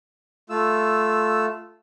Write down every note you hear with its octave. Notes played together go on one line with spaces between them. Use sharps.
A3 F4 E6